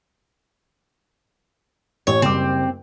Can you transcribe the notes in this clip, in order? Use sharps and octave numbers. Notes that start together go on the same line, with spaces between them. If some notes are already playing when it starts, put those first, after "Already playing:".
A1 C#5
F#1 G3 C4 D6